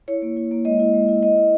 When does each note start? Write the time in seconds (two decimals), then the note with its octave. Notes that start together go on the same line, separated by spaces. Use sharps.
0.08 E4 C#5
0.22 A#3
0.37 E4
0.51 A#3
0.65 G#3 D#5
0.79 E4
0.94 G#3
1.08 E4
1.22 E4 D#5
1.37 E4